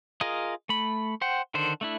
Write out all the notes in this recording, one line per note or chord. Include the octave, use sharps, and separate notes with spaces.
F4 G#4 A#4 D#5
A3 B5
C5 F#5 G5
D3 D#3 D4 C5
A3 D4 E4